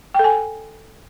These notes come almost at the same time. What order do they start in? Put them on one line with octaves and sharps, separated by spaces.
G5 A4 G#5